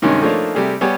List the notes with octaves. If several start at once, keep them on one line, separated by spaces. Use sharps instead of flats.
G2 C3 D#3 G#3 C#4
F3 A3 A#3 D4 D#4 C#5
C3 G3 A3 G#4
G3 B3 G4 C#5 G#5